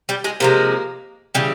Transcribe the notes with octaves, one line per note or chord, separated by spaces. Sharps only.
G3 G4
G#3 G#4
C3 F3 G#3 A#3 A#4
C#3 E3 G3